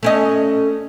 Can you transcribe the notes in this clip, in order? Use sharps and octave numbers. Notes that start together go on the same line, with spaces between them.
A3 C#4 D#5